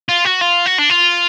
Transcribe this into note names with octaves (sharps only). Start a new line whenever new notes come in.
F4
F#4
F4
F#4
D4
F4